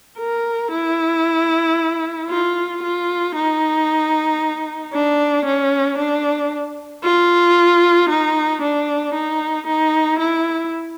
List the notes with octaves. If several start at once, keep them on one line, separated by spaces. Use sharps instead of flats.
A#4
E4
F4
F4
D#4
D4
C#4
D4
F4
D#4
D4
D#4
D#4
E4